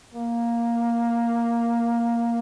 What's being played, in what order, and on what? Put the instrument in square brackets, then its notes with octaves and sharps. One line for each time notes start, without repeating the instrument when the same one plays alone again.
[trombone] A#3